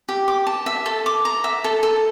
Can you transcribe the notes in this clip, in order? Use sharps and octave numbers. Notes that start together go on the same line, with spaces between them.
G4
D6
A5
E5
A4
D6
A#5
E5
A4
A4